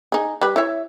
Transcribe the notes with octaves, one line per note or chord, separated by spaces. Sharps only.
D#4 G#4
G3 B4
E4 C#5 E5